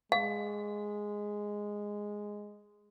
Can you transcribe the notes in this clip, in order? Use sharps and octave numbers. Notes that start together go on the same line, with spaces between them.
G#3 F5